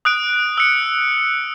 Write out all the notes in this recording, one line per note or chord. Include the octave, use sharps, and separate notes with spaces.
D#6 F#6 D7
E6 C#7